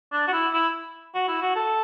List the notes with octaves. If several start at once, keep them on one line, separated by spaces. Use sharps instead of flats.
D4
F#4
E4
E4
F#4
E4
F#4
A4